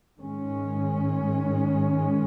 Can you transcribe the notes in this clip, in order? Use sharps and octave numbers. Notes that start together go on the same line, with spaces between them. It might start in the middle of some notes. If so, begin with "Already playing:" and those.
G#2 D#3 G#3 C#4